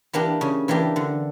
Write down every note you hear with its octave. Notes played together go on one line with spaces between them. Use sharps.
E3 A#3 D4 G4
C#3
E3 A#3 D4 G4
D3